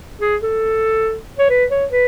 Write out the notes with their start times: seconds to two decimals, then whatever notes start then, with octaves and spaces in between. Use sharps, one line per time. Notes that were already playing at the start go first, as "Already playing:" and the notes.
0.21 G#4
0.42 A4
1.38 C#5
1.49 B4
1.70 C#5
1.91 B4